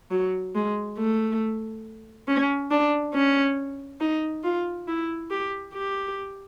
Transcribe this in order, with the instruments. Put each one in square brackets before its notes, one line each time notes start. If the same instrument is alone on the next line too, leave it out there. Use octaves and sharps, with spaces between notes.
[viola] F#3
G#3
A3
C#4
D4
C#4
D#4
F4
E4
G4
G4